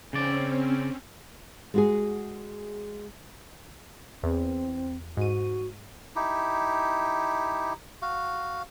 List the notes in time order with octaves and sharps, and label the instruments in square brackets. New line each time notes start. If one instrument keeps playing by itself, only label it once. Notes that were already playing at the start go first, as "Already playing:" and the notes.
[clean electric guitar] C#3 D5 [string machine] C4 C#4
[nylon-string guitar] G#3 F#4 G#4
[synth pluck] E2 [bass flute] C4
[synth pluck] G#2 D#7 [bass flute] F#4
[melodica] D#4 E4 G4
F#4 F5